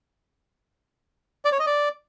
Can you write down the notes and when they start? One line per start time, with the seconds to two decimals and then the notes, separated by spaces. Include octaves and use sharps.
1.45 D5
1.52 C#5
1.59 D#5
1.67 D5